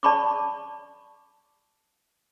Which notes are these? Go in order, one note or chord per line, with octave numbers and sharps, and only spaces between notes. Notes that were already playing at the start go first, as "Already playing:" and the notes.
D5 A5 B5 C#6 D6